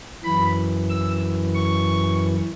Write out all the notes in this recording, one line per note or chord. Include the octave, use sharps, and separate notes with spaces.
F#2 E3 B5
E6
C#6